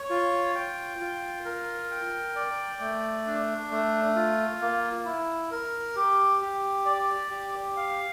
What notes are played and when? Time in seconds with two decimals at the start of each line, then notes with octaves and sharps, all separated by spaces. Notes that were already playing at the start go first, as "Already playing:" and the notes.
Already playing: C#5
0.10 F4
0.55 G5
1.00 F4
1.45 A#4
1.91 G5
2.36 D5
2.80 A3
3.26 D4
3.71 A3
4.16 F4
4.61 A#3
5.05 E4
5.51 A#4
5.96 G4
6.41 G4
6.86 D5
7.31 G4
7.76 F5